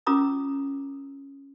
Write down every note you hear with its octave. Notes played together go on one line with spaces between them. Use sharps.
C#4 F4 A#4 A#5 D6 D#6